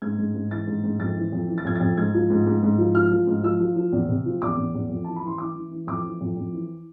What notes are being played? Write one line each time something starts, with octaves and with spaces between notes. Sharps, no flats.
G#2 G#6
G#2
G#2
E3 A6
G#2
G#2
F2 A6
E3
F2
E3
A6
F2 G#6
F2 A6
G#2 G#6
F3
G#2
G#2
G#2
F3
F3 F6
F3
G#2
F3 E6
F3
F3
E2
C3
F3
E2 D6
E2
E2
F2
E3 A5
B5
E3 C6
E3 D6
E3
E3
F2 D6
E3
F2
F2
E3